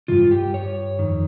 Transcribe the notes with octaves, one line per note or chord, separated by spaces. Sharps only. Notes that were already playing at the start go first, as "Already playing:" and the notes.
G2 D#3 F4
G4
C#5
F2 D#3